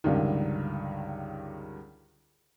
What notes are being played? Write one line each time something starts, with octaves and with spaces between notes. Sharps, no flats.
C#2 G2 D3 D#3